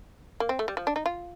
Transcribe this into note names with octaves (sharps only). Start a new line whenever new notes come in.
A#3
C4
A3
G3
F3
D4
D#4
F4